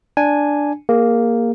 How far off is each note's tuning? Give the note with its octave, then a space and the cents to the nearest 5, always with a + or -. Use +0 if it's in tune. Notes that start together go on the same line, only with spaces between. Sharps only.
D4 +0 G#5 +0
A#3 +0 G#4 -15